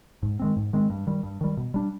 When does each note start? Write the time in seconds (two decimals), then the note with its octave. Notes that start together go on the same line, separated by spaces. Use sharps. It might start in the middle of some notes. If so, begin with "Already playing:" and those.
0.23 G#2
0.39 D#3 G#3 C4
0.56 G#2
0.73 D#3 G#3 C4
0.90 G2
1.07 D#3 G3
1.23 G2
1.41 D#3 G3
1.57 B2
1.74 G3 D4